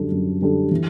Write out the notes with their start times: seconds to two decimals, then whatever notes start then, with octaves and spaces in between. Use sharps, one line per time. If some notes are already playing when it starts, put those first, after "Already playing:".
Already playing: F#2 D3 G3 D4 A4
0.12 F#2
0.41 D3 G3 D4 A4
0.71 E3